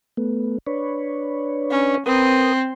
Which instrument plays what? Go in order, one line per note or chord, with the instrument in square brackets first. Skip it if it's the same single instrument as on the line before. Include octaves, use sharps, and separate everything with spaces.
[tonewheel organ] A3 B3
D4 B4 C#5
[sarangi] C#4
[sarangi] C4 [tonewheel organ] A#4 B4 D#6